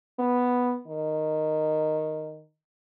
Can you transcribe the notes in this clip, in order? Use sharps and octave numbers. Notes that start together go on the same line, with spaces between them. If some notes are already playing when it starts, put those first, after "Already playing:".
B3
D#3